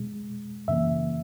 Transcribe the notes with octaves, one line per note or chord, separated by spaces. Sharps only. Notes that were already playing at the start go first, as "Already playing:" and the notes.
Already playing: B2 G#3
F#2 C#3 E3 A#3 E5